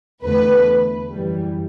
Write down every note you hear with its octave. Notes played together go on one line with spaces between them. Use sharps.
E2 D3 A3 B4
F#2 E3 G3